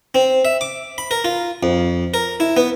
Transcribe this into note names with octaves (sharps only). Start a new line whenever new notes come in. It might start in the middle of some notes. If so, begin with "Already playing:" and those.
C4
E5
D6
B5
A#4
F4
F2
A#4
E4
B3